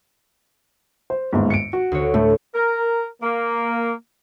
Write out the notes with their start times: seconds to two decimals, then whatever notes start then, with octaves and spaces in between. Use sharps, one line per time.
1.10 C5
1.33 G1 D#2 G#2
1.50 C#7 D7
1.73 F#4
1.92 D2 C#5
2.14 A2 A3
2.54 A#4
3.23 A#3